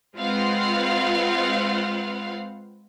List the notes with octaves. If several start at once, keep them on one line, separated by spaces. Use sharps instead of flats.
G#3 C4 F4 B4 F5 F#5